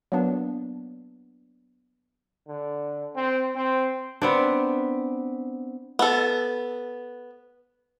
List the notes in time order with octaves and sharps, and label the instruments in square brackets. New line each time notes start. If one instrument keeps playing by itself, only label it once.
[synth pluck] F#3 A#3 B3 D4
[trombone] D3
C4
C4
[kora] B3 C4 D4
[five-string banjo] B3 A4